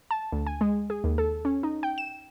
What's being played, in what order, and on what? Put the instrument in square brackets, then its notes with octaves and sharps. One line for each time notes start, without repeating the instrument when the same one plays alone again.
[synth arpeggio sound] A5
D2
G#5
G#3
G#4
D#2
A4
C#4
D#4
G5
E7